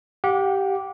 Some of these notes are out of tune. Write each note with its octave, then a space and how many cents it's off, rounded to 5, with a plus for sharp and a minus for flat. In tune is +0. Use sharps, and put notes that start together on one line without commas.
G4 -10 F#5 -35